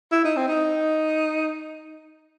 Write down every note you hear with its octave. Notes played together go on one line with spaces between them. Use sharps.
E4
D#4
C4
D#4